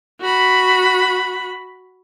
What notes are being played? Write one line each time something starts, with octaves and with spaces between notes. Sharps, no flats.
F#4 B5